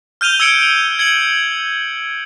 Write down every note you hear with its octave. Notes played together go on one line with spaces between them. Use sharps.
F6 G6 D#7 F7 G7
E6 G#6 C#7 D7
F7
G#6 C#7 F#7